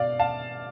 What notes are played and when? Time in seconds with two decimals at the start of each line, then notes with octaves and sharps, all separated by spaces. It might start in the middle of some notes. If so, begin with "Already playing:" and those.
Already playing: B2 D5 F5
0.19 F5 A5